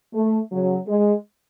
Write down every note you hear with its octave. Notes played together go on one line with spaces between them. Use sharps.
A3
C#3 F#3
G#3